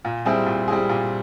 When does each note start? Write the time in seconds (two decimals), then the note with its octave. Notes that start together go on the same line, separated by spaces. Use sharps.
0.05 A#2
0.26 G3 C4 E4 G#4
0.46 A#2
0.68 G3 C4 E4 G#4
0.89 A#2